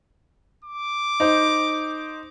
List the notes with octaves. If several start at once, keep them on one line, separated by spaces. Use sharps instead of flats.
D6
D#4 C5